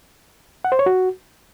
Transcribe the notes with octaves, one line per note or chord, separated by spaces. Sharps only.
F#5
C5
C#5
F#4